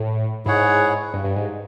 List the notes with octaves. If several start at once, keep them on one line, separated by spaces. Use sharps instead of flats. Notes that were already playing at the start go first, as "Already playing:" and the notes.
Already playing: A2
G#2 E4 G#4 C#5 F#5
G2
G2
G#2